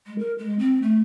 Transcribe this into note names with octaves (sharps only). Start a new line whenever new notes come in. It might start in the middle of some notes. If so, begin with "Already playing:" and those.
G#3
A#4
G#3
C4
A3